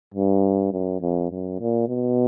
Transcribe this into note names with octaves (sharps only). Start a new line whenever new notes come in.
G2
F#2
F2
F#2
A#2
B2